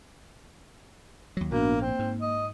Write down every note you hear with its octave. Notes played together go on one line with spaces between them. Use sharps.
D#2 F#3
A#1 G#2 A#3 B3 D4 F#4
A#3 C4
G#2
D#5